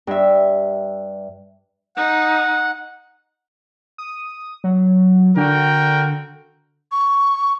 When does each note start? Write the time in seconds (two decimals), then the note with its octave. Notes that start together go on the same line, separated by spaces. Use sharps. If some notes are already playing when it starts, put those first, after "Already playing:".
0.07 G2 E5
1.97 D#4 F#5
3.98 D#6
4.64 F#3
5.37 D3 F#4 A#4 G5
6.92 C#6